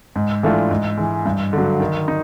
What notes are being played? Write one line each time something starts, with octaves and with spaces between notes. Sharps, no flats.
G#2
E3 A3 D4 F4
G#2
E3 G#3
G2
D3 F#3
D#3
D#4